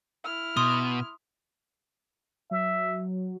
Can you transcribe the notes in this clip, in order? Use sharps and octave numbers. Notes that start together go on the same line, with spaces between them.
E4 F6
B2 C6 D#6
F#3 E5